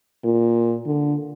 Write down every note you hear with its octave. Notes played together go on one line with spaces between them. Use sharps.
A#2
D3